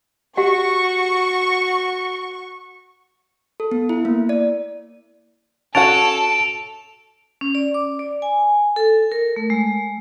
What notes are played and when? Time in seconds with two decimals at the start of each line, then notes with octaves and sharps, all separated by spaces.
0.37 F#4 G4 F#5 C#6
3.60 A4
3.71 B3
3.89 E4
4.05 A#3
4.29 D5
5.75 C#4 F#4 A4 F#5 A5 D7 F7
7.41 C#4
7.55 D5
7.74 D6
7.99 D5
8.22 G#5
8.76 A4
9.12 A#4
9.36 A3
9.50 G#3